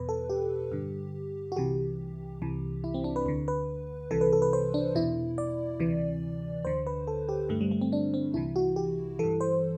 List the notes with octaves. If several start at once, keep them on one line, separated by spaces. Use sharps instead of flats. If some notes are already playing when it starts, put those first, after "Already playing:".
Already playing: E2 B2 B4
A4
G4
G2 D3
F#4
C2 C3 E3 G4
C2 C3 E3
E4
C4
D4
B4
D2 D3
B4
C2 C3 E3 A4
B4
A4
B4
C5
D4
E2 B2 E4
D5
D2 C3 E3
D2 D3 C5
B4
A4
G4
G2 D3 A3
G3
A3
C4
D4
C4
C2 C3 E3 E4
F#4
G4
G2 E3 A4
C5